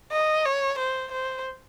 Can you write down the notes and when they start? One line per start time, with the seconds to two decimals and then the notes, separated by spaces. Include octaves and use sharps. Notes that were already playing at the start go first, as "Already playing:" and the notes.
0.12 D#5
0.45 C#5
0.79 C5
1.12 C5